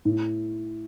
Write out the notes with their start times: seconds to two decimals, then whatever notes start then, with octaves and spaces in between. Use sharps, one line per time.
0.05 A2